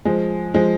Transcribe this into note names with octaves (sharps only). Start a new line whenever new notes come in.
F3 G#3
F3 G#3